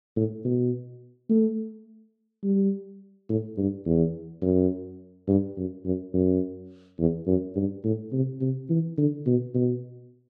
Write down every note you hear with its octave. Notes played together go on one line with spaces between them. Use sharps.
A2
B2
A3
G3
A2
G2
E2
F#2
G2
F#2
F#2
F#2
E2
F#2
G2
A2
C3
C3
E3
D3
B2
B2